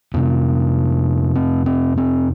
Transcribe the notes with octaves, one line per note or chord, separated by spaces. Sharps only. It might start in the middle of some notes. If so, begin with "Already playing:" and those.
F2 C3 B3
C4
C4
C4